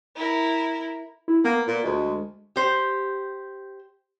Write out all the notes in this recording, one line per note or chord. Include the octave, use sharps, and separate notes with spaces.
E4 A#4
E4
A#3 B3
A#2
D2 G#3
G4 C5